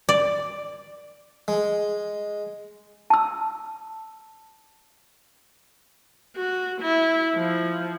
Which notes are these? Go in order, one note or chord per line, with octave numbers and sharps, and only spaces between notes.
D5
G#3
A5 E6
F#4
E4
F3